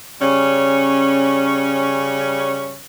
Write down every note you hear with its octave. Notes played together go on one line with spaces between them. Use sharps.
C#3 G3 C#4